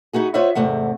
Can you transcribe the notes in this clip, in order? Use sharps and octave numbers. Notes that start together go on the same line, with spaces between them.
D#4 E4 F#4 G#4
F4 C5 C#5 D#5 E5 F#5
E2 G#2 C3 A3 F#5